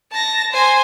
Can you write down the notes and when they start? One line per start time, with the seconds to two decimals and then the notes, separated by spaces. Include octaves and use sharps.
0.11 A5 A#6
0.52 C5 G#5